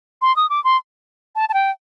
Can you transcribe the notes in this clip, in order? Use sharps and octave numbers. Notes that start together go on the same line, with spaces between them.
C6
D#6
D6
C6
A5
A5
G5